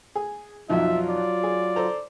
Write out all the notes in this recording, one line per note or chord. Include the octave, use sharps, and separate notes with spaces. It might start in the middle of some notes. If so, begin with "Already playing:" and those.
G#4
B1 F2 F#3 D#4 F4 E5
D5
G#4
A4 C5 A#5